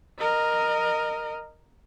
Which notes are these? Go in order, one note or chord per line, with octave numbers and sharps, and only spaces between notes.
A#4 D#5